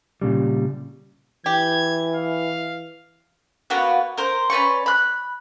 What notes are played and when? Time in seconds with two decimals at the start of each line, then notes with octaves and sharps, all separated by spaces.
0.22 A#2 C#3 G3
1.46 E3 G4 G#6
2.15 F5
3.70 A#3 B3 F#4 B4
4.17 A#4 C5
4.50 C#4 B4 D5 C#6
4.86 B5 F#6